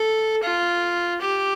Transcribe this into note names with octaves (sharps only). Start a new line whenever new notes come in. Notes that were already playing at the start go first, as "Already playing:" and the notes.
Already playing: A4
F4
G4